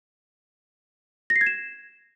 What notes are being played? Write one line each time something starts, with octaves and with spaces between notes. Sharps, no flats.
A#6
C7
G#6
E7